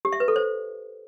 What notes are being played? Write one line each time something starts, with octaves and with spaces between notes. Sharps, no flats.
G4
E5
B4
A4
C5